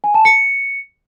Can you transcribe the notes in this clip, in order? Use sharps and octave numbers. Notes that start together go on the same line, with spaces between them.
G#5
A5
C#7